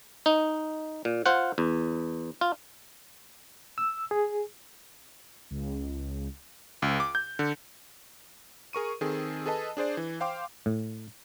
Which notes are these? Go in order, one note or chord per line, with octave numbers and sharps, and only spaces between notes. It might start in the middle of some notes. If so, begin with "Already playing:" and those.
D#4
A#2
F4 C5 F#5
E2
F4
E6
G#4
C#2
C#2
D6
G6
D3
G#4 A#4 C#6 D#7
D#3 C4 G#4 A4
G#4 A4 B4 D#5 A5
D4 G#4 C5 D5
E3
C5 F5 G5 C6 D6
A2